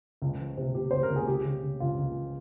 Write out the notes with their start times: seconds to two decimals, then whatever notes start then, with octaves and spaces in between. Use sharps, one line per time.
0.22 C#2
0.40 F3
0.57 C3
0.75 C3 G4
0.91 C#2 C5
1.03 A#4
1.10 C#2
1.16 G#4
1.27 C#2 G4
1.45 C#3
1.63 C#3
1.80 C#2 F4
1.99 C#2